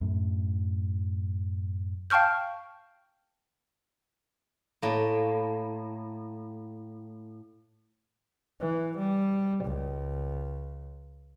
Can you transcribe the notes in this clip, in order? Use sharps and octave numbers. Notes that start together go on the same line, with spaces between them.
F#2 A2
F5 G5 A5 C#6 F6 G6
A2 A#3
E3
G3
C#2